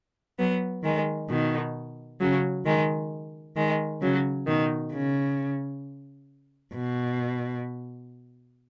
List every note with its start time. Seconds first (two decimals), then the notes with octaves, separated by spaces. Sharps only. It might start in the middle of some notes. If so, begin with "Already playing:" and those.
0.39 F#3 B3
0.83 D#3 G#3
1.29 B2 D#3
2.20 C#3 F#3
2.65 D#3 G#3
3.56 D#3 G#3
4.02 C#3 F#3
4.47 B2 D#3
4.93 C#3
6.75 B2